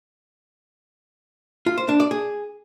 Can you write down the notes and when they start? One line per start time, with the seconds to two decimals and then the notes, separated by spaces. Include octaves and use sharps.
1.66 F4
1.78 C5
1.89 D4
2.00 D5
2.11 G#4